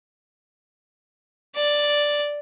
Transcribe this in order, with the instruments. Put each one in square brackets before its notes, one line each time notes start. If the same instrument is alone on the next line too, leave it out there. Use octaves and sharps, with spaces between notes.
[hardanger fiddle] D5